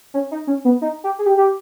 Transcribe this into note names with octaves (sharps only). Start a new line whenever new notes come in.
C#4
D#4
C#4
B3
D#4
G4
G#4
G4
G4